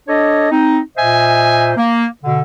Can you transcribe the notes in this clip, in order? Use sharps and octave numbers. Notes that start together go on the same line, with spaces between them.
D4 A4 C#5 D#5
C4 D#4
A#2 C5 D#5 E5 G#5
A#3
B2 D3